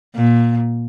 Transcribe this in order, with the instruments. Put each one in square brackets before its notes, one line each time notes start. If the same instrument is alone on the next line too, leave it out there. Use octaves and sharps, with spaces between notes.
[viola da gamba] A#2